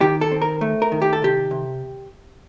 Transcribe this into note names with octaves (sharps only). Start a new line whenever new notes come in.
D#3 G4
A4
C4
A#4
A3
A#4
D#3
G4
A4
C3 G4
C3